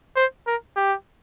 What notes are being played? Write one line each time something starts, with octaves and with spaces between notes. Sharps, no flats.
C5
A#4
G4